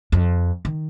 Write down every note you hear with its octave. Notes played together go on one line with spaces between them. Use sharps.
F2
D#3